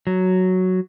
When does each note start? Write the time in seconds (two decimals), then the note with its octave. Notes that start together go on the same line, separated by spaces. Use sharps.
0.07 F#3